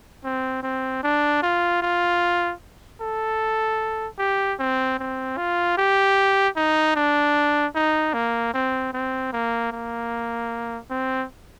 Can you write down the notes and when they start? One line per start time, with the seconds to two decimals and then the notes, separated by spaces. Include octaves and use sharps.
0.24 C4
0.63 C4
1.03 D4
1.43 F4
1.82 F4
3.01 A4
4.19 G4
4.59 C4
4.99 C4
5.37 F4
5.77 G4
6.56 D#4
6.96 D4
7.75 D#4
8.14 A#3
8.54 C4
8.93 C4
9.33 A#3
9.72 A#3
10.90 C4